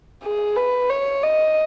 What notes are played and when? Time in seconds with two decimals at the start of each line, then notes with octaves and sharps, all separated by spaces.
0.24 G#4
0.56 B4
0.90 C#5
1.23 D#5